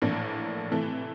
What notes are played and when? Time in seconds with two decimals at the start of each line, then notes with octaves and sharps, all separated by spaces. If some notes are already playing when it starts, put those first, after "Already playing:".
0.02 A#1 A2 E3 A#3 D4
0.70 C3 E3 A3